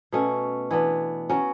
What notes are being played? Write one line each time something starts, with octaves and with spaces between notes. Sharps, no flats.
B2 A3 C#4 F#4
E3 B3 D4
F#3 C#4 F#4